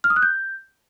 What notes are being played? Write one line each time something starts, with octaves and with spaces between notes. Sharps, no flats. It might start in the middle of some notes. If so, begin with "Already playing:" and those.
F6
D#6
F#6
G6